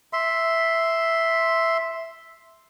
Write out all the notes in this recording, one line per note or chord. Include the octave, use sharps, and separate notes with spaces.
E5 C6